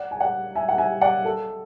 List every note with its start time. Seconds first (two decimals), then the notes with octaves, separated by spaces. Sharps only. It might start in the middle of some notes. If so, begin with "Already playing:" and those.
Already playing: D5 F#5
0.11 G#5
0.20 D5 F#5
0.55 E5 G#5
0.69 F#5
0.78 E5 G#5
1.01 D5 F#5
1.25 A4